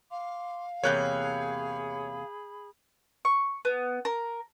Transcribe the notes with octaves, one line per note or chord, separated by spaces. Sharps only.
F5 C6 D6
E2 C3 A#3 G#4 C#5 B5 F#6 G6
C#6
B3
A#4